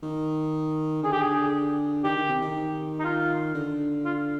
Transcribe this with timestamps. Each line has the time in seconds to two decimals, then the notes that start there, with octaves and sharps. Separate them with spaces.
0.03 D#3
1.03 D3 G#4
1.12 G4
1.22 G#4
2.04 D#3 G4
2.17 D#3
2.29 C3
2.41 D#3
2.99 D#4
3.04 F4
3.55 D3
4.05 F4